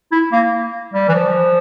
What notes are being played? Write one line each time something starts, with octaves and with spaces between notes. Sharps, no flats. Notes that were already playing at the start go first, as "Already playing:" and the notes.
E4
A#3
G3
E3
F3